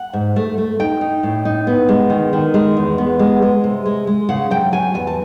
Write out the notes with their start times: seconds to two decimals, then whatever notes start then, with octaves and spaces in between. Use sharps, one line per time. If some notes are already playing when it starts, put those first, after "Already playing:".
Already playing: F#5
0.13 G#2
0.36 A3
0.58 A3
0.80 D#4 G5
1.01 D#4
1.23 A2
1.45 D#4
1.67 B3
1.89 G#3
2.10 D#3
2.33 D#3
2.54 G#3
2.77 E2
2.98 B3
3.19 G#3
3.42 G#3
3.64 C3
3.86 G#3
4.07 G#3
4.29 C#3 F#5
4.51 F#3 G5
4.72 F#3 G#5
4.94 E2 G#5
5.07 A5